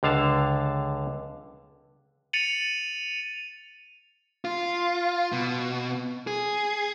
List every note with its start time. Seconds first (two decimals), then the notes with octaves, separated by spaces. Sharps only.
0.03 C#2 D3 F5 A5
2.33 A6 C#7 D#7 F7 F#7
4.45 F4
5.32 B2
6.27 G#4